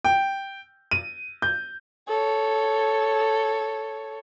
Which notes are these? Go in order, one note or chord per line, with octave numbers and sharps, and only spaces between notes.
G5
D#7
G6
A4 C#5